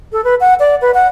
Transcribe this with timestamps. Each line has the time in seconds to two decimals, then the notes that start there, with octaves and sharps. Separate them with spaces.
0.12 A4
0.24 B4
0.40 F#5
0.60 D5
0.81 B4
0.94 F#5